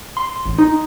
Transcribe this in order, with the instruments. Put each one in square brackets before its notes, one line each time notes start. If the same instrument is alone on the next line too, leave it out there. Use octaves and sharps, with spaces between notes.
[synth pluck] C6
A1
D#4